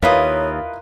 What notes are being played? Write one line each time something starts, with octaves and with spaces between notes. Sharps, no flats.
D#2 E4 F4 A#4 B4 C#5 D#5 F5